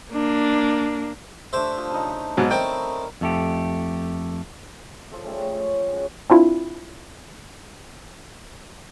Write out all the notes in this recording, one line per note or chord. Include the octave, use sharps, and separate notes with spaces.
A#3 D4
A3 D4 G4 C5 E5
F3
C#3 D#4
G#2 B2 F#3 E5
G3 A3 C4 D#4 A#4 C#5 G5
F2 A3 G4
F3 F4 A4 F5
G3 A3 C#4 G#4
A4 C#5
F3 G#3 C#4
G#4 F5
C#4 F#4 D#5
C4 D4 E4 F4